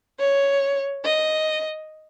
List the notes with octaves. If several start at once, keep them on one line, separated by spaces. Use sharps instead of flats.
C#5
D#5